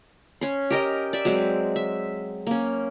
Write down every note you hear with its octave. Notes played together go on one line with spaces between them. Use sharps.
C#4 C6
G4 A#4 D#5
D5 E5
F#3 G#3 C4
E5
A#3 C#4